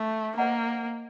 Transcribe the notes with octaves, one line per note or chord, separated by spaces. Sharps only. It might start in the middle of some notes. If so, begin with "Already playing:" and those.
Already playing: A3
A#3 C5 D#5 F#5 A#5